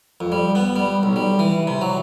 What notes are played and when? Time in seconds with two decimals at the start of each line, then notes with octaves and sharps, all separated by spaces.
0.20 F2
0.32 G3
0.55 B3
0.76 G3
1.03 B1
1.16 G3
1.39 E3
1.67 C3
1.81 F#3